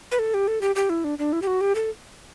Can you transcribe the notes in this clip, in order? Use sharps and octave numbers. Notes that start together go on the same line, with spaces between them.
B4
A4
G4
A4
G4
G4
E4
D4
D4
E4
G4
F#4
G4
A4